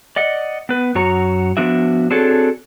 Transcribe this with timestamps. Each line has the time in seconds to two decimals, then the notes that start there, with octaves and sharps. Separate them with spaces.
0.16 D5 D#5 F#5
0.69 B3 B4
0.95 F#2 F#4 C#5 A#5
1.57 F3 B3 D4 F#4 E5
2.10 C4 D4 F#4 G#4 A4 C#5